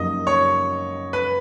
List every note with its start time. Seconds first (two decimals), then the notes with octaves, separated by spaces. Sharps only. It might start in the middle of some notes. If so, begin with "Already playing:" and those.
Already playing: F#2 F3 A#3 D#4 D#5
0.27 C#5
1.13 B4